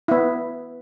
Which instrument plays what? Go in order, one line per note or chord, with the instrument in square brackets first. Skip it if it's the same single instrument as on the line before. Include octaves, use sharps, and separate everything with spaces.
[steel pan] B3 E4